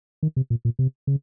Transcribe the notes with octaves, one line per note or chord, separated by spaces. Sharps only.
D#3
C3
A#2
A#2
C3
C#3